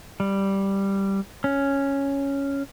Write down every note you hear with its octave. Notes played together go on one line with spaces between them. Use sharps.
G3
C#4